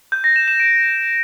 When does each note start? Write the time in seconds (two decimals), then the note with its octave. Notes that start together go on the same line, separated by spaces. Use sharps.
0.12 G6
0.24 A#6
0.36 E7
0.48 E7
0.60 D7